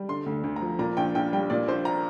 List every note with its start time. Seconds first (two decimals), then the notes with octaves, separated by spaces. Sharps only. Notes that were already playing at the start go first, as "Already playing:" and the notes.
Already playing: G3
0.09 D3 C6
0.26 D2
0.44 D2
0.56 A#5
0.61 F3
0.79 A#2 A#5
0.97 A#1 G5
1.15 A#1 G5
1.33 G3 G5
1.50 A#2 D5
1.68 A#1 C5
1.85 A#5